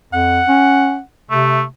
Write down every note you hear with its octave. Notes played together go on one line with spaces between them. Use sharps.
F2 F#5
C#4
C3 A3